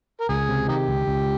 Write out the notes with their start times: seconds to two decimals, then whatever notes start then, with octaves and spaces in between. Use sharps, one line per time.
0.21 A#4
0.29 C#2 G#4
0.49 C3
0.68 D#3 D#4 G4
0.88 C#2
1.08 C#2